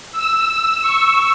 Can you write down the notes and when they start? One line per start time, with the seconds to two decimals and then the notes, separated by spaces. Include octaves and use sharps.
0.12 E6
0.82 C#6